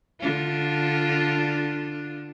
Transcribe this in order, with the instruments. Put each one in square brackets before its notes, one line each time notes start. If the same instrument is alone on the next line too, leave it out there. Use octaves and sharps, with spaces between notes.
[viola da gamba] D3 D4 F4